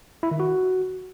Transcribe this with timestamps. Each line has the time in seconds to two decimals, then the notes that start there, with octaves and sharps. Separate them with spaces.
0.23 E4
0.31 D#3
0.40 F#4